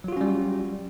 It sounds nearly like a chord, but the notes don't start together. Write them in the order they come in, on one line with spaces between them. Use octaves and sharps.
F#3 F4 F#4 C#4 G3